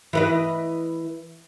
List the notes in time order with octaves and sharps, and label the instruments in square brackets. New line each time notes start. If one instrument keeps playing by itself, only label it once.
[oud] E3 B4 D#5